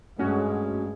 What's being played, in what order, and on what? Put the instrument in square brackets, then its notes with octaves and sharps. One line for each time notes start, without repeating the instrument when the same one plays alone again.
[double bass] G2 G#3 [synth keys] A3 C#4 F#4